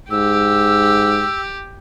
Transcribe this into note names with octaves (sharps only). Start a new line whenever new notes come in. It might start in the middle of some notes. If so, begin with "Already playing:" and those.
G#2 G4 E6